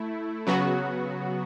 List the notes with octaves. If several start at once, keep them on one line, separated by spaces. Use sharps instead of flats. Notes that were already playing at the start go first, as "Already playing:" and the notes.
Already playing: A3 E4
C#3 F#3 B3 F#4